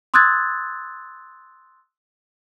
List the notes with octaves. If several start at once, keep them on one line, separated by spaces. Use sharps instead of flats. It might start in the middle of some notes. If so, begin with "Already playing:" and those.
C6 D#6 E6 F#6 G#6 A6